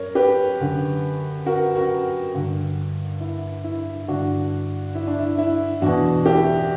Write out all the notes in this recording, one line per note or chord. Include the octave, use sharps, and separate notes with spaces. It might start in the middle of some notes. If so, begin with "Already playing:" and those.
Already playing: F#2 A#4 C#5
G4 B4
F#2 D3
F#4 A#4
F#4 A#4
G2 D3
E4
E4
G2 D3 D4 F#4
E4
D4
E4
E4
E2 B2 D4 F#4
E4 G4